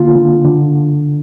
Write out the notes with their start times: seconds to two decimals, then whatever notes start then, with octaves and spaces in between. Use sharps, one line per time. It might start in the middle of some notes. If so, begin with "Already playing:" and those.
Already playing: D3 A#3 F4
0.15 D3
0.44 D3